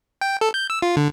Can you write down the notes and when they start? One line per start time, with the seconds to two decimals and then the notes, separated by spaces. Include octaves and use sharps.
0.21 G5
0.41 A4
0.54 G6
0.70 E6
0.82 F4
0.97 D3